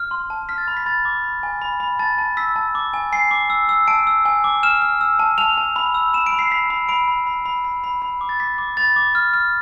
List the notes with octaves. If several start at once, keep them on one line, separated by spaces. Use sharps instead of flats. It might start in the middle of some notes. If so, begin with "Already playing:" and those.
Already playing: F6
C6
A5
F6 B6
A6
B5
B6
B5 A6
D6
B5
G#5
B5
B5
A5 A6
A5
E6 B6
A5
D6
G#5
G#5 C7
D6
E6
E6
A5 D7
E6
G#5
D6
F6 E7
F6
E6
A5
A5 F7
A5
B5
E6
B5 E7
D7
B5
C7
B5 B6
B5
B5 D7
B5
B5
B5
B5
B5
B5
D6
A6
D6 B6
D6
B5 A6
D6
F6
F6